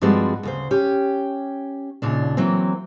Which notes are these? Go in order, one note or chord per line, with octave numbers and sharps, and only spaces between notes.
G2 F3 G3 G#3 C4 F#4
D2 C#3 C5
C#4 G4
D#2 A#2 C#3 D4
E3 F#3 A#3 C4